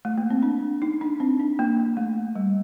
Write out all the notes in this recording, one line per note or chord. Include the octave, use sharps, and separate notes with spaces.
A3
A#3
C4
D4
D#4
D4
C4
D4
A#3
A3
G3